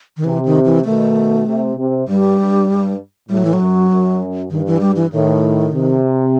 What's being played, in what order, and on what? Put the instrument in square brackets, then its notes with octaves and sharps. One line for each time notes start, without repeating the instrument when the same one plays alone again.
[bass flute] D#3
[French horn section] C3 [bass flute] E3
[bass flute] D#3
E3
[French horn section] B2 D#3 [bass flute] A3
[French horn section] C3
C3
[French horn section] G2 [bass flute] G3
[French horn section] G2
G2
[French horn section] A2 [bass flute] G3
[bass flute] F#3
E3
F#3
[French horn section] F#2
F#2
[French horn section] G2 [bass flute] D#3
[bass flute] E3
G3
E3
[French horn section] A2 [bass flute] D#3
[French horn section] C3